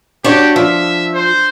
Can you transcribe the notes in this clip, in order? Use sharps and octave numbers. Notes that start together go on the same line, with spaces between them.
D4 F#4 G4 C#5
F3 E5
C5